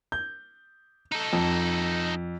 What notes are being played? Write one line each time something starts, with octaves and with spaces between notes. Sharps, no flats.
G6
D#4 A4
F2